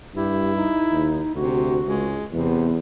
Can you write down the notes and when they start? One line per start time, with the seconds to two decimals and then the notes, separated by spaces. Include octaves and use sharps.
0.15 G2 E4 G4
0.56 D#4
0.91 D#2
1.35 D2 C3 F#4
1.87 C#2 G#3
2.32 E2 C3 B3